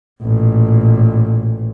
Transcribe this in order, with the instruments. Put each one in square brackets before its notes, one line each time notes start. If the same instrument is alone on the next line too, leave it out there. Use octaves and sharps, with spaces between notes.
[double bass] A1 A#2